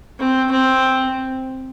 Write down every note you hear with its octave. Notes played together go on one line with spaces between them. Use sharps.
C4
C4